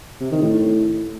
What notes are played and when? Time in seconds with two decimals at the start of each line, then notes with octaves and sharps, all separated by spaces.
0.21 C3
0.32 D#3
0.42 A2